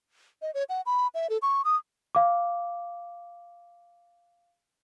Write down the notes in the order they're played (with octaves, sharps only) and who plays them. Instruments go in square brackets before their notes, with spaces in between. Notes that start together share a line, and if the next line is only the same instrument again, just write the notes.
[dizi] D#5
C#5
F#5
B5
E5
A4
C#6
D#6
[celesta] F5 D6